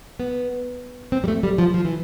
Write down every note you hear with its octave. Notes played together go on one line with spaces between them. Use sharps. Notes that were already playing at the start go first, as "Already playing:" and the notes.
B3
C4
G3
A3
G3
F3
F3
E3